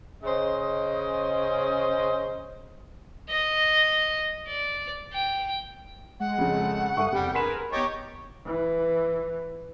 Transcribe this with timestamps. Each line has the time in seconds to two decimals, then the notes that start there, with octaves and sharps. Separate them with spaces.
0.23 C#3 C#4 C5 D#5
3.29 D#5
4.46 D5
5.13 G5
6.20 G#3 F#5
6.38 F2 C#3 A3
6.97 G2 A4 E5 C#6 D#6
7.12 E2 C3 G3 G5
7.34 G#4 A#4 B4 C6 B6 E7
7.72 B3 D#4 G4 C#5 D#5 A6
8.46 E3